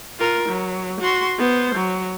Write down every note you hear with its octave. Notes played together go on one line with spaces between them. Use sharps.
F4 A#4
F#3
F#4 C6
B3 C5
F#3